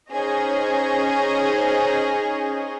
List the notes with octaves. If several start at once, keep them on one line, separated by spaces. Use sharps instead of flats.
C#4 D#4 G#4 C5 C#5 D#5